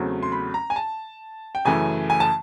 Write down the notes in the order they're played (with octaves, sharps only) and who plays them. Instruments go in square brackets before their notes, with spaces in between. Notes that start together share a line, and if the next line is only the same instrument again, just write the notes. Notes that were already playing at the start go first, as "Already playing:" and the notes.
Already playing: [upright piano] E2 C#3 F#3 A3 C4
C6
B5
A#5
G#5
A5
G5
F#2 C#3 E3 A3 G#5
G#5
A5